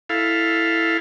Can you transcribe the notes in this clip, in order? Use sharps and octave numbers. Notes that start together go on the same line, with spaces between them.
E4 A4 F5